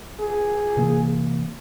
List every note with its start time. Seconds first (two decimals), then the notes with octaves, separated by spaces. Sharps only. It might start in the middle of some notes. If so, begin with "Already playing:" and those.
0.20 G#4
0.77 C3 E3 A#3